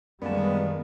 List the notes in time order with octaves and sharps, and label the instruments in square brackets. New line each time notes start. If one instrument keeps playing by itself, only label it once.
[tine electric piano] F#2 A#3 A5 [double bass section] D#3 G3 G#3 [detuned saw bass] B3 [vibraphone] D5